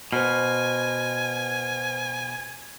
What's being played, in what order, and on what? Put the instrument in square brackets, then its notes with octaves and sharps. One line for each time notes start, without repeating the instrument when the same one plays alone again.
[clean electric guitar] B2 [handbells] C5 F6 [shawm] G#5